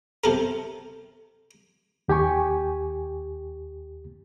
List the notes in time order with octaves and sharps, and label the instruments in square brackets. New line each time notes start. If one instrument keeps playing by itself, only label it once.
[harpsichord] C3 A4 A#4
[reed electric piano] D#2 G4 G5 G#5 C#6